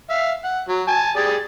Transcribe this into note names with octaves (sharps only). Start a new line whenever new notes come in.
E5 F5
F#5
F#3
G#5 A5
G4 G#4 D5